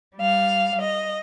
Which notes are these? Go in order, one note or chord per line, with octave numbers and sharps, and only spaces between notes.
G3 F5
D#5